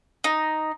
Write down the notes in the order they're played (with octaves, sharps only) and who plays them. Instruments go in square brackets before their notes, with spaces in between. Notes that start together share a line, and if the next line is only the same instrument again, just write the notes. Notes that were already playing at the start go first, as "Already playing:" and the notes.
[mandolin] D#4